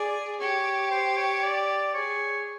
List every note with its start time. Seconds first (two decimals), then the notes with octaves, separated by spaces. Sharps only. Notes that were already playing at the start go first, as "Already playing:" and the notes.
Already playing: G#4 D5
0.40 G4 C#5
0.91 C5
1.17 C#5
1.43 D5
1.94 G#4 C#5